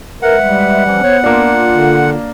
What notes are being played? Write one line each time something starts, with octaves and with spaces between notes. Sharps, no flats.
G#3 A#4 B4 E5 F#5
G3
E3 F3 C#4
B3 C5 C#5
A#3 D4 F4
D3